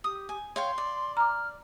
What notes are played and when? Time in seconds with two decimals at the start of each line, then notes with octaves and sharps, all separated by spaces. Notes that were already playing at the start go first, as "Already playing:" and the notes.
0.04 G4 D#6
0.29 G#5
0.56 C#5 F5 G5 C6
0.78 D5
1.17 A#5 D6 F6